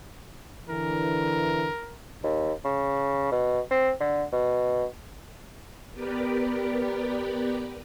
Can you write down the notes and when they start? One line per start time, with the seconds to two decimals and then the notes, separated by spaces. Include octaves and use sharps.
0.69 D3 E3 A#4
2.24 D#2
2.65 C#3
3.32 B2
3.71 C4
4.01 D3
4.33 B2
5.93 B3 G4 A#4 B4 D5 G5